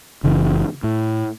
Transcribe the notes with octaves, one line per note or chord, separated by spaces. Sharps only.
F#1 C#3 E3
A2